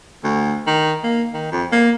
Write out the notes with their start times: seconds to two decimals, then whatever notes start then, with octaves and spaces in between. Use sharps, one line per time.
0.24 D2
0.67 D#3
1.04 A#3
1.34 D#3
1.52 F2
1.72 A#3